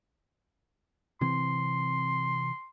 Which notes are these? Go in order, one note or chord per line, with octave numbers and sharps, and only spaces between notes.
C3 E3 C4 C6